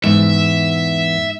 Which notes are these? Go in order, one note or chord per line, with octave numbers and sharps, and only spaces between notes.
E2 G#2 E5